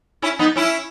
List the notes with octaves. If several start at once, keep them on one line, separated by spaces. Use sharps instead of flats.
C#4 E4
B3 D#4
C#4 E4